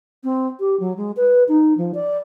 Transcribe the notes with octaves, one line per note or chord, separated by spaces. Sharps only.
C4
G4
F#3
G#3
B4
D#4
F3
D5